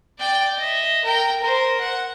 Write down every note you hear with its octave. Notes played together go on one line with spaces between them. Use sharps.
D5 G5
D#5 E5
A#4 G5
A#4 C5
F#5